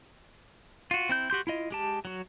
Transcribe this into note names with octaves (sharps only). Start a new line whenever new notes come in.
F4 F#4
C4 E4 G6
F#4 G4 C6 G6
E4 F4 D#5
G#3 G4 A5
F#3 F#4